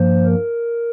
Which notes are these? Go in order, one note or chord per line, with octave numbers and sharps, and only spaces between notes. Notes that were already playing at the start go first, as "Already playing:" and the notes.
Already playing: G2 F3 A#3 C5
A#4